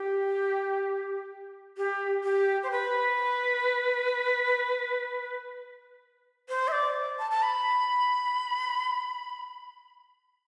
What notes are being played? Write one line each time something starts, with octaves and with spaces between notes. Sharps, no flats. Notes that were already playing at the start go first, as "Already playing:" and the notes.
Already playing: G4
G4
G4
C5
B4
C5
E5
D5
A5
A5
B5